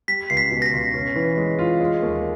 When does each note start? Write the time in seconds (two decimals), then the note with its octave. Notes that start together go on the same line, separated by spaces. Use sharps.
0.08 G3 B6
0.30 C#2 C7
0.37 B6
0.51 B2
0.62 A#6
0.66 B6
0.73 C#2
0.94 C#4
1.16 E3
1.38 G#3
1.59 F4
1.80 G#3
2.02 D#2